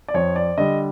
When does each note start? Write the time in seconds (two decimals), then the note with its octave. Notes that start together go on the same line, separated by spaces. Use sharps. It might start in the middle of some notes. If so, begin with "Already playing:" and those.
0.08 D5
0.14 F2 C#5
0.36 D5
0.58 D3 G3 D#5